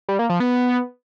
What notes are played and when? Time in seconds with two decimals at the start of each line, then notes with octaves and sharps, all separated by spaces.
0.09 G3
0.19 A#3
0.30 F3
0.40 B3